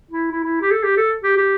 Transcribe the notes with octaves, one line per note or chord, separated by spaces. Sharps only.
E4
E4
E4
G4
A4
G4
A4
G4
G4